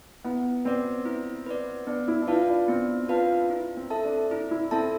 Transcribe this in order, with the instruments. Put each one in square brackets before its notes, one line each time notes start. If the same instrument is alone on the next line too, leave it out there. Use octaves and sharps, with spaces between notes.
[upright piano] B3 [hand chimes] E4
[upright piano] C4 [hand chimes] B4 D5
[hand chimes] E4
B4 D5
[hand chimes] B3 [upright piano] D4
[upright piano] E4
D4
[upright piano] E4 [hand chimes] F4 B4 F5 A5
[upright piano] D4
[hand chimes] B3 [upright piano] C4
[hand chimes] F4 B4 F5 A5
E4
[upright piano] C4
[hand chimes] A4 E5 A5
[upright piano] D4
[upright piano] D4 [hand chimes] E4
[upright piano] E4
[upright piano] C4 [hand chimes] A4 E5 A5